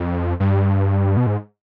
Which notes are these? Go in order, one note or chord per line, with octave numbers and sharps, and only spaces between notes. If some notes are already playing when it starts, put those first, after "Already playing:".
Already playing: F2
G2
B2
G#2